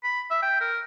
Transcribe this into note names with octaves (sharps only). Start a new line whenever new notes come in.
B5
E5
G5
A#4